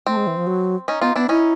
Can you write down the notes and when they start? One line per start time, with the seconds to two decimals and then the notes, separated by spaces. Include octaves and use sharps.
0.07 A3 C4
0.17 G#3
0.27 E3
0.37 F3
0.47 F#3
0.88 C#4 D#4
1.01 B3 D#4 F4
1.16 B3 D4 E4
1.29 C#4 D#4 E4